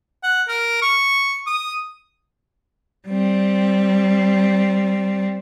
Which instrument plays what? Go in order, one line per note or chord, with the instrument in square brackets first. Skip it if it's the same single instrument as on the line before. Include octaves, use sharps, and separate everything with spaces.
[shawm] F#5
A#4
C#6
D#6
[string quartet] G3 C4